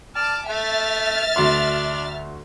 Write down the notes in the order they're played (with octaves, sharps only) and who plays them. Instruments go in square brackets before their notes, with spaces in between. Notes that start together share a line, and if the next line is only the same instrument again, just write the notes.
[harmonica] D5 F6 [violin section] A5 D6
[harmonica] A3 [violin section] E5 F6 A6
[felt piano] D2 F#4 C6 [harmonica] D4